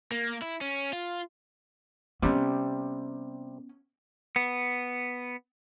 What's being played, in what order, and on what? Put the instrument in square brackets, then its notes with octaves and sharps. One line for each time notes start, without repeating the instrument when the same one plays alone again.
[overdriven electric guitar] A#3
E4
C#4
F4
[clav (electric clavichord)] C3 G3 [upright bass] B3 C#4
[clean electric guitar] B3